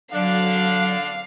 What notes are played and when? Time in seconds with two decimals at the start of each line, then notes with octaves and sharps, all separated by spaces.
0.13 D3 F#3 D4 F5